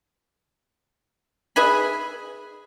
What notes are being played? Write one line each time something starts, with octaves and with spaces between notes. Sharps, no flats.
G#4 B4 E5 G#5 B5